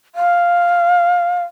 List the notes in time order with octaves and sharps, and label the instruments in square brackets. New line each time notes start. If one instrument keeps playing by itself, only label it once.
[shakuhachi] F5